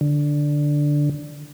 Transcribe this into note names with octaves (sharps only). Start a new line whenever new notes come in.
D3